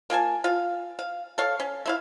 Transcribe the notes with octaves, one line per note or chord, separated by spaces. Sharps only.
A#3 F4 G#5 A5
F4 F5
F5
A4 C#5 F5
C#4
A3 E4 F5